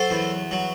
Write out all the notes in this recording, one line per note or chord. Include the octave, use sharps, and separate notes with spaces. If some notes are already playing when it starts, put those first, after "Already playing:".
Already playing: F#3 A4 C5
E2
F#3